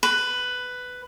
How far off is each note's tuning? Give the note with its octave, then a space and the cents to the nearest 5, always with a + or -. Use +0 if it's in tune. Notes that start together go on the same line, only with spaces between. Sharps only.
B4 +10